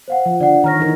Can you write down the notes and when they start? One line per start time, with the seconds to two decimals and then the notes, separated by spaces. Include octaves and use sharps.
0.08 C5 F5 F#5
0.26 F3
0.40 D3 D5 F#5
0.64 D#3 C#5 A#5 F6 A#6
0.79 E3 D#4 A#4